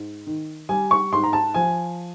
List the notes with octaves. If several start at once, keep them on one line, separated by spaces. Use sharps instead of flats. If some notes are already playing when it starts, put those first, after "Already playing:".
Already playing: G#2
D#3
G3 G#5
C#6
G#2 C6
A#5
A5
F3 G#5